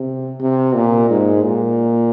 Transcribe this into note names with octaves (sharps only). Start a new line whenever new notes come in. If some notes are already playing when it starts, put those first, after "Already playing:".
Already playing: C3
C3
A#2
G#2
A#2